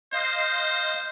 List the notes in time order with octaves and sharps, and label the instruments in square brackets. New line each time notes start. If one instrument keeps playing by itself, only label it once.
[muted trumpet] C5 [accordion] D#5 F5 C6